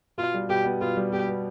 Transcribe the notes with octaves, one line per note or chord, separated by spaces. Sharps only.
B2 F4
G3
B2 G4
B3
B2 F4
G3
B2 G4
B3